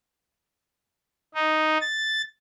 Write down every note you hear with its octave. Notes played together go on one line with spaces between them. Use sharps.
D#4
A6